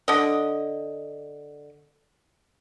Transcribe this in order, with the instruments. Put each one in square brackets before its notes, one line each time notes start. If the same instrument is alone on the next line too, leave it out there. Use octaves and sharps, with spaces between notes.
[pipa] D3 D#5